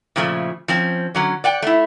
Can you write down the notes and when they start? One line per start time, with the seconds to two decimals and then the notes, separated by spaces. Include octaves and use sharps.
0.16 A#2 C#3 F3 A3
0.68 F3 C4 C#4
1.15 D3 F#3 C#4
1.44 D5 F#5 G5
1.62 A3 E4